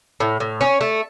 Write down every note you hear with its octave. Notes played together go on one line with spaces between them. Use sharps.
A2
A2
C#4
A3